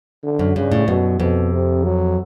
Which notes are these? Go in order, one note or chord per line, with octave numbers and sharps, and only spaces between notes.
D3
F#2
G2 C#3
A2
F#2 B2
F2 B2
C3
F#3